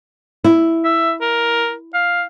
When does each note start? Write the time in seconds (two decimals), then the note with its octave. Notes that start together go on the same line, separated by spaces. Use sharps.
0.44 E4
0.85 E5
1.21 A#4
1.94 F5